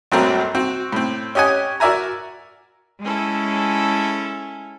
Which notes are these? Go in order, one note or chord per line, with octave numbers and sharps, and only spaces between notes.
A#1 G2 F#3 A3 C4 A#4
C4 F#4
A2 C4
C#4 G4 D#5 F#5 G#5
F#4 A#4 D5 E5 G#5 A#5
G#3 C#4 E4 A4